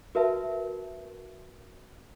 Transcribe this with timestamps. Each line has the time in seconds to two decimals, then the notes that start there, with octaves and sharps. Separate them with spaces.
0.15 F#4 A#4 B4 E5 A5